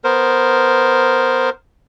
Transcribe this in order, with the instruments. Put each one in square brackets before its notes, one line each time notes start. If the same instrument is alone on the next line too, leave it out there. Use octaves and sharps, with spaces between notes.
[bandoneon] B3 A#4 C5